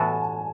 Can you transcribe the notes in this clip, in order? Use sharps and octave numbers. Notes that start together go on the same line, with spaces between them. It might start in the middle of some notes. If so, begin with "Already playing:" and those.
Already playing: A2 E3 B3 F#4 A4 G#5 A5